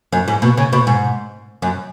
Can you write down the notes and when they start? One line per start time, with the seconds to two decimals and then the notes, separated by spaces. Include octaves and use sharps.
0.13 F#2
0.28 G#2
0.42 B2
0.58 C#3
0.73 B2
0.87 G#2
1.62 F#2